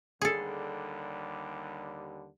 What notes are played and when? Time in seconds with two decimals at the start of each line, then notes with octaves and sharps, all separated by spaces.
0.21 D#2 D3 G3 G#4 A4